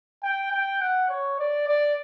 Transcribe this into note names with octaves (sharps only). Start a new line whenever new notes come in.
G5
G5
F#5
C#5
D5
D5